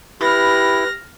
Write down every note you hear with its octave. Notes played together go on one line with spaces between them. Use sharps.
E4 G4 B4 F6 A#6